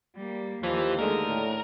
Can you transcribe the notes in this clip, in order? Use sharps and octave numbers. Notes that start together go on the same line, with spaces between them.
G3 A#3
D#2 E3 F3 G4
D3 D#3 G#3 A3 A#4
A2